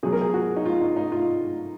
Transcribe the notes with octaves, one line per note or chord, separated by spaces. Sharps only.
B2 F#3 G#4
A#4
G#4
F#4
D#4
F4
D#4
D#4
F4